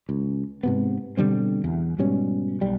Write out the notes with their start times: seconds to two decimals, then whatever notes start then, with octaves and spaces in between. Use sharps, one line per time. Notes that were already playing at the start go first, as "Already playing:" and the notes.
0.09 C#2
0.63 G#2 C3 B3
1.17 B2 D3 G3 C4
1.64 E2
1.98 G#2 B2 G3 C#4
2.61 B1 G3